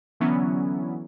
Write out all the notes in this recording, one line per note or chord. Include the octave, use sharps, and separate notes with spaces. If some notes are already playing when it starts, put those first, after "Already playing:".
D3 E3 F#3 B3 C#4 E4